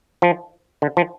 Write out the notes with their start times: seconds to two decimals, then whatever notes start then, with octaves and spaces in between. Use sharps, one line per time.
0.22 F3
0.82 D3
0.97 F3